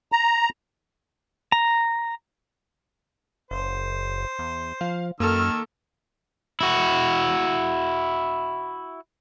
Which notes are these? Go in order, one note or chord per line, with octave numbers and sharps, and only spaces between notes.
A#5
A#5
F#1 C5
E2
F3 F5
F#2 D#3 A#3 A4 E6 F6
E4 F#4